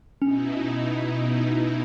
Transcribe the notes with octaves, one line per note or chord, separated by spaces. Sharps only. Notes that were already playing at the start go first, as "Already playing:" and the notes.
B2 C#4 D#4 E4